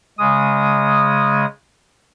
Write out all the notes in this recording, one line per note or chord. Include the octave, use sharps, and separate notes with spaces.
C#3 G#3 D#6